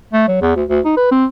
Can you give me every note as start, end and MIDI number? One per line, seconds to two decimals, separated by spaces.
0.13 0.27 57
0.28 0.38 54
0.41 0.52 40
0.56 0.64 38
0.69 0.80 38
0.85 0.93 63
0.97 1.09 71
1.11 1.25 60